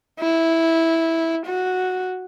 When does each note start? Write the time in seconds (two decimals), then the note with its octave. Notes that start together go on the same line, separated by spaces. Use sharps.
0.20 E4
1.47 F#4